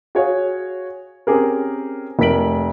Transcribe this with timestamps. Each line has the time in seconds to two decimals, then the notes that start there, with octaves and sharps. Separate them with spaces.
0.15 F#4 G#4 C#5 F5
1.27 C4 C#4 G4 G#4 A#4
2.19 F1 A3 A#4 B6 D7 F#7